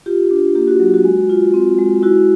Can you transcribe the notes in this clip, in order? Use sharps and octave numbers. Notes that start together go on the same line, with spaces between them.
F4 G4
D4
A#3 G4
F#4
F#3
F#4
G#3
F4
C4
G#3
E4 F#4